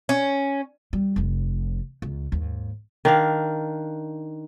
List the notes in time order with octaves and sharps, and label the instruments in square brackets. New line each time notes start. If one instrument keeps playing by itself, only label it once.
[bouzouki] C#4
[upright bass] G3
F1 F3
C#2
D#2 G#2
[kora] D#3 D4 F5